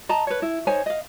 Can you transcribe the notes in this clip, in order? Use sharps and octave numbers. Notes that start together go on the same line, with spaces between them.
D#5 A5 A#5
B4 C#5
E4
D#4 C5 C#5 G#5
D#5 F5